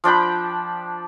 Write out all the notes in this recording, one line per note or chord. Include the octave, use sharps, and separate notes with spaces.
F3 D4 G5 B5